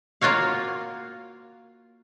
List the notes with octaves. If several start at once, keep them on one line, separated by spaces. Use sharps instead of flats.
A#3 F4 F#4 C#5 F5